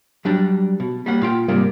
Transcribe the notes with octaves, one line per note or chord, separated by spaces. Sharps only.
F#3 G3 D4
B2
G3 A#3 F#5
A#2 F4 G5
G#2 C3 G3 A#3 D5